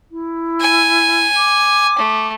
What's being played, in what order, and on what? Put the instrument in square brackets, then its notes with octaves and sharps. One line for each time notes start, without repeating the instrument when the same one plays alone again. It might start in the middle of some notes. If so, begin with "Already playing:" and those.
[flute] E4
[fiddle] G#5
[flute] D6
[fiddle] A3